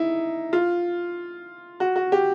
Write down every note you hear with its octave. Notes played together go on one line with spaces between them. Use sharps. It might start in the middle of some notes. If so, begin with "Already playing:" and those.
Already playing: D#4 E4
F4
F#4
F#4
G4